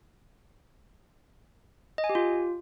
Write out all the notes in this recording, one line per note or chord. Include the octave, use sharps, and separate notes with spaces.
D#5
G#5
G4
F4